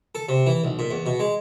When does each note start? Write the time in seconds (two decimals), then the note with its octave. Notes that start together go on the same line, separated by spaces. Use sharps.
0.15 A4
0.29 C3
0.46 E3
0.64 B1
0.79 A#2
0.91 E2
1.06 B2
1.20 G#3